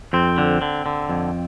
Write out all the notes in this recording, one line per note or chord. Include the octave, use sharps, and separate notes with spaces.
F2 C4
D3
D3
D3
F2